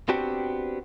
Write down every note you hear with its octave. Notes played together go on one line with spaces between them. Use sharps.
B3 C4 D4 F#4 G4